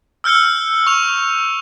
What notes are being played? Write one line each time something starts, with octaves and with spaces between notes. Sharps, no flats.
E6 F6 G6 C#7 G7
C#6 F7